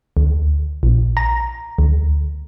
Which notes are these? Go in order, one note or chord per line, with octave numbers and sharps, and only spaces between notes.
D2
A#1
A#5
D2